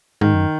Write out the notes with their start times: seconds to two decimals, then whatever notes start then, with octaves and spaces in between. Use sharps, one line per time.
0.21 G#2 D#3
0.34 F#2